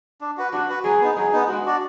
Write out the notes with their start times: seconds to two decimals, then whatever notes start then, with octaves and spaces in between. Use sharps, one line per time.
0.21 D4
0.37 F#4 B4
0.53 D4 F#4
0.69 F#4 B4
0.84 F#3 G#4
1.01 B3 D#4
1.17 F#3 G#4
1.32 B3 D#4
1.48 G#3 F#4
1.65 D4 F#4 D5